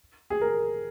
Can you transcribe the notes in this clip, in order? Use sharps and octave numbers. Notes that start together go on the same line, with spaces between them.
G#4
A#4